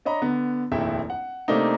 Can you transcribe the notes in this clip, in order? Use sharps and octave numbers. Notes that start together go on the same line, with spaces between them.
D4 C#5 D#5 A#5 B5
D3 B3
F1 A#1 D#2 E4 E5 G5
F#5
C3 A3 A#3 C4 D4 D#4